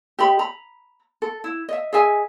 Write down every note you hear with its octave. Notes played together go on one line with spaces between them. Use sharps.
G4 D#5 B5
A#5 B5
A4
E4
D#5 E5
G#4 D#5 E5 G#5